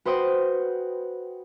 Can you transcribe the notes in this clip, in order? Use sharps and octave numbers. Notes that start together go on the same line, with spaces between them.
F#4 B4 C5 F#5 G5 D#6